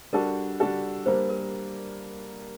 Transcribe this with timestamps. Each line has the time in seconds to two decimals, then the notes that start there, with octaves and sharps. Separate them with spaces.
0.13 G3 D4 F#4 A4 A#4
0.60 G3 D4 F#4 A4
1.06 G3 A#3 D4 C5
1.29 A#4